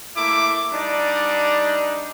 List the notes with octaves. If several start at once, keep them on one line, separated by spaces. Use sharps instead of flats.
A3 A#3 E4 D6
G3 D4 D#4 D5